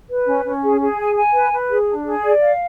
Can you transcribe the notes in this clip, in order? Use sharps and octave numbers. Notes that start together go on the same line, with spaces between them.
B4
C#4
C#4
G#4
G#4
G#5
G#5
B4
B4
G#4
D4
G#4
D5
F5